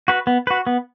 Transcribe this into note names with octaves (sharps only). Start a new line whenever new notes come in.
F#4 B4
B3
F#4 B4
B3